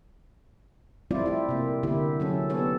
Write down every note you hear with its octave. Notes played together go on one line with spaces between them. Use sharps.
G3 A3 C4 E4 F4 D5
E4 G4
C3 A#3
D3 A#3 E4 G4
F#3 C#4 A4
B3 G4 A4 C#5